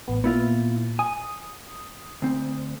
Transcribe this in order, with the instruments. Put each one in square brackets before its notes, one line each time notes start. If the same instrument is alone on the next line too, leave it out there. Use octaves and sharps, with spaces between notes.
[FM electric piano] A1 B3
[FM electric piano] A#2 [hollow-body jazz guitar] B3 E4 F4
[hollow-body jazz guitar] G#5 [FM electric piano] D#6
[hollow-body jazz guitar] D2 C4